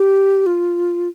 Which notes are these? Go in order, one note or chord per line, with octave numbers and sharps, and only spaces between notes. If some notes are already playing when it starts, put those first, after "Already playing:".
Already playing: G4
F4